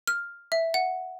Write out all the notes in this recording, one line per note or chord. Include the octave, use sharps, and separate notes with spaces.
F6
E5
F#5